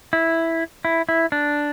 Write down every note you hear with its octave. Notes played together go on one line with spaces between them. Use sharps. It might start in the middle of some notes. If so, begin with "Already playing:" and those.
E4
E4
E4
D4